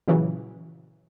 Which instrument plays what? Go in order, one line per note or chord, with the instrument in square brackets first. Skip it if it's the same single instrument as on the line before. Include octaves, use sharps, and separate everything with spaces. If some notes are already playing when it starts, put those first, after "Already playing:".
[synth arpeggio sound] A#2 C#3 E3 F#3